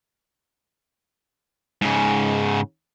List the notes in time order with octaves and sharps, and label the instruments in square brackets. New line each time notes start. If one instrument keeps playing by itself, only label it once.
[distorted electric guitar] G#2 C#3